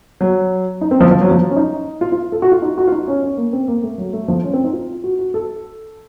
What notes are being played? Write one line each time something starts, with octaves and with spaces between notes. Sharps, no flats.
F#3
D#4
C4
F3
F3
F#3
F3
C#4
D#4
F4
F4
A4
F#4
F4
D#4
F#4
F4
D#4
C#4
C#4
A#3
C4
A#3
A3
F#3
A3
F3
C#4
C4
D#4
F4
F#4
F#4
A4